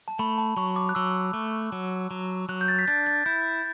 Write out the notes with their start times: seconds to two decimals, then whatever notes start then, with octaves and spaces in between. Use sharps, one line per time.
0.08 A5
0.19 A3 B5
0.38 A5
0.57 F#3 C#6
0.76 D6
0.89 F#6
0.95 F#3 E6
1.34 A3
1.72 F#3
2.11 F#3
2.49 F#3 F#6
2.61 G6
2.68 A6
2.79 B6
2.88 D4 A6
3.06 A6
3.26 E4 G6